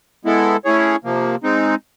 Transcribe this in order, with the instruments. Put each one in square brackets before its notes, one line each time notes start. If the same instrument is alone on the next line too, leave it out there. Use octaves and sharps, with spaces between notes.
[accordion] G#3 B3 E4 A4
A3 C#4 E4 G#4 C#5
C3 F3 A#3
G#3 C4 D#4